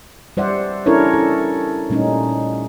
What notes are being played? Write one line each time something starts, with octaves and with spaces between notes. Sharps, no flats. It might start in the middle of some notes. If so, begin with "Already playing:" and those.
G3 C5 D5 E5 F#5
C#4 D4 E4 A4 A#4 C#5
A4
A#2 G3 A3 C#4 D#4